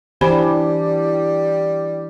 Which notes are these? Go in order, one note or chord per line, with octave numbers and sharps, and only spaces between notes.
E3 G3 D4 G4 C5 G#5 B5